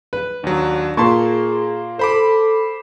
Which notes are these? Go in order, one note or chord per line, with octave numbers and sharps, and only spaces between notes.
B4
D#2 F#3 D4
A#2 A#3 G#4 A5 C6 C#6
A4 C5 B5 D6